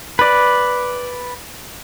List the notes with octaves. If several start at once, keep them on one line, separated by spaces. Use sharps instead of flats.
B4 D5